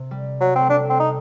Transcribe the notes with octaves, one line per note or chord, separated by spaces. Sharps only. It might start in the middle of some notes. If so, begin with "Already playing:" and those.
Already playing: C3
G3
F#3
A3 C4
G3 D4
C4
D#4